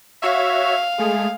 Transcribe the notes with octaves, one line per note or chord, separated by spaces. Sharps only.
F#4 C#5 E5 F5
G#3 A3 G#4